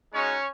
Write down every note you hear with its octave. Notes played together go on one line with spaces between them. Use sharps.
G#3 C#4 D#4 F#4 C#5